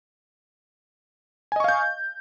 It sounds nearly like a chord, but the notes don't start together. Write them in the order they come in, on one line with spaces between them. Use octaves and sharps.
G#5 D#5 C#6 F5 G6